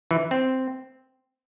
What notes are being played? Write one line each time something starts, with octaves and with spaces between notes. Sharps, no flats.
E3
C4